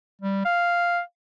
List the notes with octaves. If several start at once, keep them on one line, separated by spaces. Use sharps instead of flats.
G3
F5